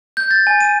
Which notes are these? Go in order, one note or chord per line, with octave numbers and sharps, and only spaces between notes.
G6
A6
G#5
D#7